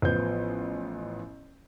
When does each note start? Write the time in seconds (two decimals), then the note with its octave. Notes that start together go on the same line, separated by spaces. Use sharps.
0.02 A1 F3 B3 C5 G6